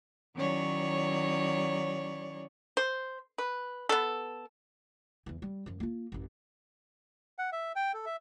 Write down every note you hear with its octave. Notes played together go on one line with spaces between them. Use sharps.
D#3 F#3 C#4 E4 C#5 D5
C5
B4
B3 A4
E2 E3
G3
F#2 F3
A#3 F4
A1 F#2
F#5
E5
G5
A4
E5